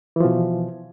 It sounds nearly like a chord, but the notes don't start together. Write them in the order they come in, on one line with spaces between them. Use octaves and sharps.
E3 F3 B2